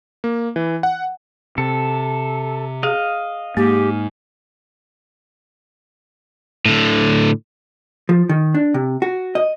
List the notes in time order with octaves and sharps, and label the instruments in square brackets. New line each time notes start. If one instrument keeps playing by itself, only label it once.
[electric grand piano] A#3
E3
F#5
[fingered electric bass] C3 [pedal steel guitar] A4
[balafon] G#4 [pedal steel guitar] D#5 F5
[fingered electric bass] G#2 [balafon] A#3 [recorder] G4
[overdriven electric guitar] A2 D3
[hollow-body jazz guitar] F3
D#3
D4
C3
F#4
D#5